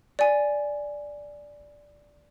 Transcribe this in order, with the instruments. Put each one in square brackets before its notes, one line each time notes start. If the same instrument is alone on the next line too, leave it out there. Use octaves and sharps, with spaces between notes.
[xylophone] D5 G#5